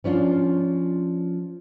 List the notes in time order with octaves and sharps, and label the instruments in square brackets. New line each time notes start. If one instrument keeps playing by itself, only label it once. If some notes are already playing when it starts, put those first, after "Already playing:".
[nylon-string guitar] F3 C#4 D4 F4